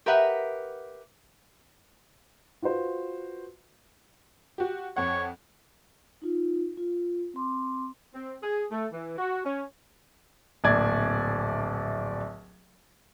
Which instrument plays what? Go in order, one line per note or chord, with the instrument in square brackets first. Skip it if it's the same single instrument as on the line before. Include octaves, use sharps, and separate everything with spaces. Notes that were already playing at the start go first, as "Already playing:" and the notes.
[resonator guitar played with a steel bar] G4 A#4 B4 D#5 E5 F#5
[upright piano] F4 F#4 B4 C5
[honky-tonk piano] F#4 G4
[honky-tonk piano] F2 F#5 [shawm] C#5
[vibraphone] D#4 F4
F4
C4 C6 D6
[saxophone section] C4
G#4
A3
E3
F#4
C#4
[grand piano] D1 A#1 D5 G#6